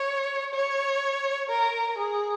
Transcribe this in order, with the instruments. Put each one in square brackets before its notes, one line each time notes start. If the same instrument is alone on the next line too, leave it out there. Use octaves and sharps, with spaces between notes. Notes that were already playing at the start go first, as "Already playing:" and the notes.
Already playing: [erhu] C#5
C#5
A#4
G#4